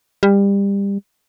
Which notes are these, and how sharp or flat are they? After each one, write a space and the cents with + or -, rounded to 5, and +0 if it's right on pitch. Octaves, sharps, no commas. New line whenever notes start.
G3 +25